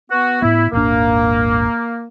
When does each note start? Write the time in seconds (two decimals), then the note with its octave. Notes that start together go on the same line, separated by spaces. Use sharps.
0.11 B3 F#4
0.42 A2 B3 E4
0.73 D#1 G#1 A#3 D4